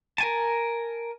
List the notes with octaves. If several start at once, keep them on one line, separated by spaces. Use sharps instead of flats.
A#4 G#5 A5